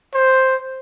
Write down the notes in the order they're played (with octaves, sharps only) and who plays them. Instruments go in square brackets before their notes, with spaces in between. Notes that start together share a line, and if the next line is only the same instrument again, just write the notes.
[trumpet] C5